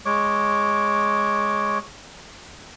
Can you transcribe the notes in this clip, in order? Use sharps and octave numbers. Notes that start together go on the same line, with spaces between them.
G#3 C#5 D6